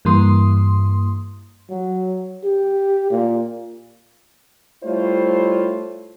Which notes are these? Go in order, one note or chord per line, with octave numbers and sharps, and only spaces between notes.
G2 E3 A#3 C6 D#6
F#3
G4
A#2
G3 A3 E4 F4 C5 C#5